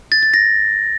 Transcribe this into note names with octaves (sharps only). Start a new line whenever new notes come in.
A6
A6
A#6